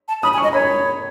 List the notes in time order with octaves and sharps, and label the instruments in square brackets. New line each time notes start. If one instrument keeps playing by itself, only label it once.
[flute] A5
[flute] B5 [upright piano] D#6
[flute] G#5
[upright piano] C#6
[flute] D#5
[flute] C#5 [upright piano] B5